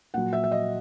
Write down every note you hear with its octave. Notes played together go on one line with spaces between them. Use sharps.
A#2 F#3 F#5
E5
E5
D#5